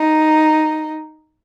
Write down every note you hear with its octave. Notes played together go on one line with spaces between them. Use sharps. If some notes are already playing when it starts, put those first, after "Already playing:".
Already playing: D#4